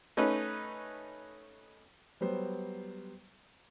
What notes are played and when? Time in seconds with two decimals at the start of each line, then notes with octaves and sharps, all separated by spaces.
0.17 A3 C#4 D#4 B4
2.21 F#3 G3 B3 C5